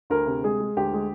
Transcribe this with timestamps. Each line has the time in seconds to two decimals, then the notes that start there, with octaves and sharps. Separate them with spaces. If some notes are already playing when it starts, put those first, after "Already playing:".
0.10 D2 A#4
0.26 C3
0.44 G#3 G#4
0.60 G#3
0.77 D2 G4
0.93 G#3